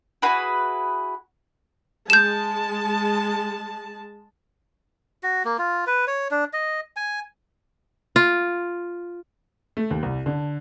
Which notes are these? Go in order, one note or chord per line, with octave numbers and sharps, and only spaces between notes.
E4 F#4 G#4 B4
G#3 A5 G6 E7
F#4
A#3
F4
B4
C#5
D4
D#5
G#5
F4
A3
D#2
C2
D3